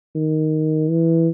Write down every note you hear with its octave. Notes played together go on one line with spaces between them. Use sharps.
D#3
E3